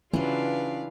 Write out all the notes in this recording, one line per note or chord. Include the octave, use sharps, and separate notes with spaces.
C#3 E3 F#3 C#4 D4 F4 B4 F5